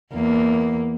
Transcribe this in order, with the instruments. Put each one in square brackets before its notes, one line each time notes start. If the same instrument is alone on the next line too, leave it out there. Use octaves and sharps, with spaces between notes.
[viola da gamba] E2 A#3